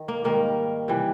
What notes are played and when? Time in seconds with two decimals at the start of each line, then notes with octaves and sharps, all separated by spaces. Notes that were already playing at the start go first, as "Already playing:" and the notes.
Already playing: D#3
0.08 A#3
0.24 G#2 D#3 G3 A#3
0.88 C3 E3 G3